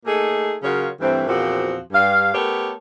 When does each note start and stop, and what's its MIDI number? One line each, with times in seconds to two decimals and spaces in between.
0.05 0.55 57
0.05 0.55 58
0.05 0.55 63
0.05 0.55 68
0.63 0.89 49
0.63 0.89 54
0.63 0.89 65
0.63 0.89 66
0.63 0.89 70
0.63 0.89 73
1.01 1.24 43
1.01 1.24 52
1.01 1.24 57
1.01 1.24 60
1.27 1.79 40
1.27 1.79 46
1.27 1.79 53
1.27 1.79 60
1.27 1.79 66
1.93 2.32 43
1.93 2.32 77
2.35 2.72 57
2.35 2.72 59
2.35 2.72 67
2.35 2.72 69
2.35 2.72 70
2.35 2.72 73